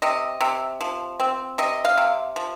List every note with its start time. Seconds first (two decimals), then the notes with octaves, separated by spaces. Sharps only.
0.02 C3 D#5
0.41 C3
0.81 F3
1.20 C4
1.58 C3 D#5
1.85 F5
1.97 C3
2.36 F3